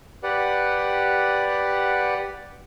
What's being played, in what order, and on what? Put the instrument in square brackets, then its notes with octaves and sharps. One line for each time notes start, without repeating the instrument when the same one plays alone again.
[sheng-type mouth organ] G4 B4 D5 F#5